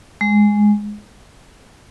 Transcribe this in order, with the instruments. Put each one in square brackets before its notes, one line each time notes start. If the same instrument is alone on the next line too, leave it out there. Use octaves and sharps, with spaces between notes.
[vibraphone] G#3